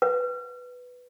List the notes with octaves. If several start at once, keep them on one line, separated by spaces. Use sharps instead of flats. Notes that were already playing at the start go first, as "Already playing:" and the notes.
B4